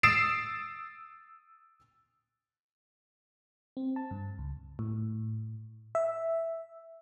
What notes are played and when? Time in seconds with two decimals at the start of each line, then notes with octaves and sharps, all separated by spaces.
0.03 D#6 E6 A6 C7 D7 E7
3.77 C4
3.96 A5
4.11 G2
4.38 C#2
4.79 A2
5.95 E5